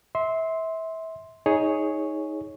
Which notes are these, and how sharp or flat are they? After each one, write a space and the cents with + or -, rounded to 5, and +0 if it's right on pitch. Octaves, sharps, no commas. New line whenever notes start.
E5 -25 C6 +0
D#4 +20 G#4 +0 C#5 +0